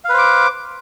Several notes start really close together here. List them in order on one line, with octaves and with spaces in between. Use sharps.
F5 B4 C5 D6